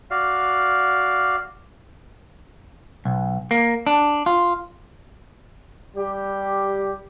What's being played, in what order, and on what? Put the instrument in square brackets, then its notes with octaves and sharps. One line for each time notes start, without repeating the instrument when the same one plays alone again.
[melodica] F#4 D5 F5
[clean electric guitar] B1
A#3
D4
F4
[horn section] G3 G4